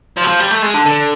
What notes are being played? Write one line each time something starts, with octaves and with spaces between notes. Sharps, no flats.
F3
F#3
F3
G3
A3
G#3
D3
D3